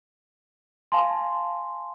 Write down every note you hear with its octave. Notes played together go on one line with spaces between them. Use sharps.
F5 G#5 A5 C6